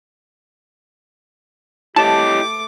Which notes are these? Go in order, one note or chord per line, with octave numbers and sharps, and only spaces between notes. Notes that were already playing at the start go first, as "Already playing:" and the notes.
A3 E4 G4 C#5 D#5 A5 D6